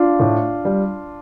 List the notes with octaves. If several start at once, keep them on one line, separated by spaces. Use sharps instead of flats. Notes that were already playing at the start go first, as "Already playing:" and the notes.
Already playing: D4 F4
A2
G3